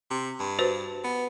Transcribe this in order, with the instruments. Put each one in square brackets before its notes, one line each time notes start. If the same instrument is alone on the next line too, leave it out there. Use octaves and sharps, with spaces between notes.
[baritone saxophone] C3
G2
[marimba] F#4 B4 C5
[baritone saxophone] B3